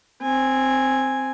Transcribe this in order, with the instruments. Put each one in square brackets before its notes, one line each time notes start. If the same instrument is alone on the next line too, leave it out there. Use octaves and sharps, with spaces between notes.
[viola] C4 G#5